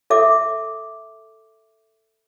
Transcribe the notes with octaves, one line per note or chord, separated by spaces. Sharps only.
A4 E5 D6